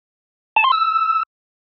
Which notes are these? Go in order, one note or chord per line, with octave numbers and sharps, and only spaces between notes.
A5
C6
E6